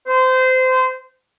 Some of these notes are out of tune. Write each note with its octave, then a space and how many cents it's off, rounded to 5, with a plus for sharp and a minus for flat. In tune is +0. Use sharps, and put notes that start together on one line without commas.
C5 -25